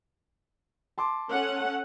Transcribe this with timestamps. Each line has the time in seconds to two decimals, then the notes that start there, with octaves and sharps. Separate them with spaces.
0.98 A5 C6 D6
1.32 C#4 A4 F#5